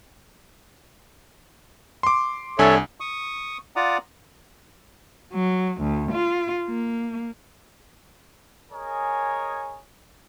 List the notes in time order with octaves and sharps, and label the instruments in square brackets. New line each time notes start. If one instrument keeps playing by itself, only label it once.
[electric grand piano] C6 D6
[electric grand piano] C2 D4 G#5 [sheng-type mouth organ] A4 C#5 E5
[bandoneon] C#6 D#6
F4 D5 F#5 A#5 D6 D#6
[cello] F#3
D2
F4
A#3
[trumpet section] G#4 A#4 C#5 D#5 G#5